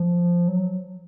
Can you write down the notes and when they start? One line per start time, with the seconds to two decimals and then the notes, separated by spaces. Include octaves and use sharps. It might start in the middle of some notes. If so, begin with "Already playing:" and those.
Already playing: F3
0.48 F#3